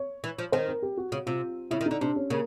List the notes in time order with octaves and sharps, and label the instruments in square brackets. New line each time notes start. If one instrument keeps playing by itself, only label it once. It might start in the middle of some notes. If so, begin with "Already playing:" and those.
Already playing: [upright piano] C#5
[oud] E3
F3
[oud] D#3 [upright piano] C5
[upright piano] A#4
G4
F#4
[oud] C#3 [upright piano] F#4
[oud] C3 [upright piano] F4
[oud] C#3 [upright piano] E4
[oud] D#3
[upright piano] D#4
[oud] D3
[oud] C3 [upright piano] D4
[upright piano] C#4
[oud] C#3 [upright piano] A#3